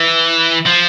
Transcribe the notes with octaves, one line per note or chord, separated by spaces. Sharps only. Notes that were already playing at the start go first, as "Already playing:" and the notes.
Already playing: E3
F3